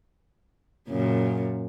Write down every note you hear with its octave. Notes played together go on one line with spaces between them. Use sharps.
F#2 A#2 C#3